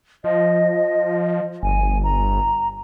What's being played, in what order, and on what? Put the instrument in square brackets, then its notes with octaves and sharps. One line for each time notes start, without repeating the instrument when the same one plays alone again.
[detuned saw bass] F3 [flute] D#5
[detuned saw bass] G1 [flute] G#5
[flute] A#5